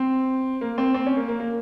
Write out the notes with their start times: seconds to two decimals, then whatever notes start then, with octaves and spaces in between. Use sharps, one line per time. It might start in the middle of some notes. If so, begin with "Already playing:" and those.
Already playing: C4
0.61 A#3
0.78 C4
0.94 C4
1.06 C#4
1.17 A#3
1.28 A#3
1.40 A#3